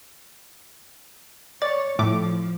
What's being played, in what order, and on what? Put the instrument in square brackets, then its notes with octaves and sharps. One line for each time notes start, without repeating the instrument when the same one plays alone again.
[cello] C#5 [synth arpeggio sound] D5 A6
[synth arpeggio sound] A2 D6 [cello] F3